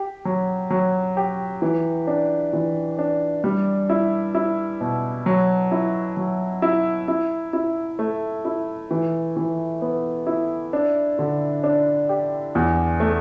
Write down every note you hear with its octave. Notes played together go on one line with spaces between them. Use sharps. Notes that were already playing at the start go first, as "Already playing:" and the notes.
Already playing: G4
F#3
F#3
G4
E3
D4
E3
D4
G3
E4
E4
B2
F#3
E4
F#3
E4
E4
E4
A3
E4
E3
E3
B3
E4
D4
D3
D4
G4
E2
A3